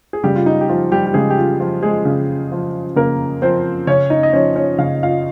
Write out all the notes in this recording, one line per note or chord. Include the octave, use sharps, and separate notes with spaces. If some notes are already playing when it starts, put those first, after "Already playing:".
G#4
C#3 G3 G4
F4
D#4
G4
F3 F4
G3 G4
G4
C#3 G#3 G#4
G4
F4
F3
G#3 G#4
C#3
F3
C#3 A#3 A#4
F3 C4 C5
C#3 C#4 C#5
D#4 D#5
D#5
F3 C#4 C#5
C#4 C#5
C#3 F5
F4 F5